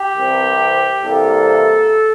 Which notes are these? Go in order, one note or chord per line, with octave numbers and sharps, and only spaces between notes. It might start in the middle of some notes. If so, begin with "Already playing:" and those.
Already playing: G4
C2 C3 E3
C2 C3 E3 G3 A#3 A4